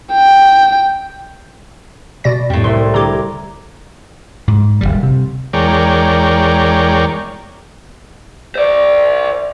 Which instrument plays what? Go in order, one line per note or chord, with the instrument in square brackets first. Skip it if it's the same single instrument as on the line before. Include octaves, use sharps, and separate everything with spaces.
[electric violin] G5
[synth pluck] B2 D5 A#6
[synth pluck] F2 [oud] A2 G3
[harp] C2 E5 [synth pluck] C6
[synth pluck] D3 G4 [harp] A#5 D6 G#6
[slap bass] G#2
D1 C#2 G3
C3
[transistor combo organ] E2 G#3 A#4 C#5 D5 G5
[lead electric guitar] C5 D5